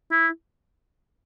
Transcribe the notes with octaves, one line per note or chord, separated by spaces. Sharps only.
E4